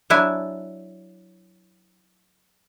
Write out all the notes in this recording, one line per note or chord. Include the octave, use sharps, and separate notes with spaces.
F#3 D4 E4 G#5